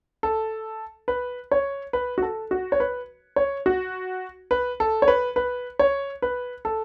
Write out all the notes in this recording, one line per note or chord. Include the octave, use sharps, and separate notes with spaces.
A4
B4
C#5
B4
F#4
A4
F#4
C#5
B4
C#5
F#4
B4
A4
C#5
B4
B4
C#5
B4
A4